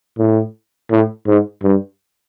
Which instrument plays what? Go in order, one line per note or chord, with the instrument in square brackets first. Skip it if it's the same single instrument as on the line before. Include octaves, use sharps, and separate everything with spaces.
[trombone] A2
A2
G#2
G2